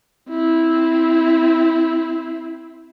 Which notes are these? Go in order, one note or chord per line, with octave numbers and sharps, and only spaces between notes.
C4 E4